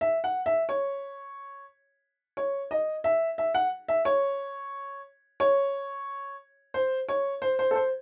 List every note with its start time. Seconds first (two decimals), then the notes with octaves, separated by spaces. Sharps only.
0.01 E5
0.24 F#5
0.46 E5
0.69 C#5
2.37 C#5
2.71 D#5
3.04 E5
3.38 E5
3.55 F#5
3.88 E5
4.05 C#5
5.40 C#5
6.74 C5
7.09 C#5
7.42 C5
7.59 C5
7.71 A4
7.76 C5